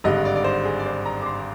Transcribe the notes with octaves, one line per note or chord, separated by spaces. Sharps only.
G#1 G2 D3 D#5
D5
D5
C5
G#4
D5
C5
A#5
D6
C6